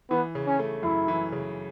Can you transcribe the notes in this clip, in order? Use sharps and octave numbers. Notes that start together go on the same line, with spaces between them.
E3 B3
C#3
C#4
A3
F#2 E4
E3
C#3